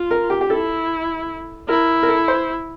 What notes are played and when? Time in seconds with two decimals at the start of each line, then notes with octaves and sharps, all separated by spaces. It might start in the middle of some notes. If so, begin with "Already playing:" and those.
Already playing: F4
0.11 A#4
0.30 G4
0.41 G4
0.50 E4 A4
1.68 E4 A#4
2.03 A#4
2.08 A4
2.28 C5